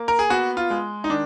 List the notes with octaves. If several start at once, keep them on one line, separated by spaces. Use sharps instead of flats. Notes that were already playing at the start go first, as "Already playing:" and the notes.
Already playing: A#3
A#4
G#4
B3 F#4
F4
G#3
D#4
D#3 D4